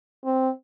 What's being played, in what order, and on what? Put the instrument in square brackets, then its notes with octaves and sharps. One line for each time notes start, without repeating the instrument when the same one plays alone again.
[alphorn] C4